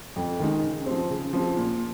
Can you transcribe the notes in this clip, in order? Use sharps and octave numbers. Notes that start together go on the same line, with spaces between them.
F2
D#3 G#3 D#4
C#3
F3 C4
C#3
F3 C4
A#2